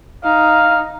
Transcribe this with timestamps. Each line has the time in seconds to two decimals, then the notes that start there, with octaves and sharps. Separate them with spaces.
0.24 D#4 F5